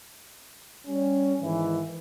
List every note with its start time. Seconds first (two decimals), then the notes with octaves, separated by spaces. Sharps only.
0.87 G3 C#4
1.41 G#2 D#3 E3